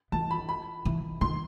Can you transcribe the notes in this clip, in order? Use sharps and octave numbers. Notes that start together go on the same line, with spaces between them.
E3 A5
B5
B5
E3
D#3 C6